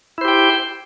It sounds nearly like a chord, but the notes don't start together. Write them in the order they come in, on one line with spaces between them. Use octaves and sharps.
E4 C5 G4 G5